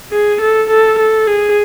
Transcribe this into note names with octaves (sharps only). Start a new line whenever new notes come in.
G#4
A4
A4
A4
G#4